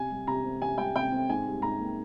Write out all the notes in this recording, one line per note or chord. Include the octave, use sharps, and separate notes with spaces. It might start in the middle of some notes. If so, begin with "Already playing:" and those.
Already playing: C3 G#5
G3
C3 A#5
C4
C3 G#5
G3 G5
C3 G5
C4
G#2 G#5
G3
G#2 A#5
A#3